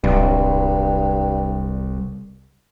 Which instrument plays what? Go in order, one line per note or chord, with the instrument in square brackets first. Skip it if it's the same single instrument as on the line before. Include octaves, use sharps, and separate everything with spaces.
[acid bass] D1 [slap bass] C2 [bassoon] G2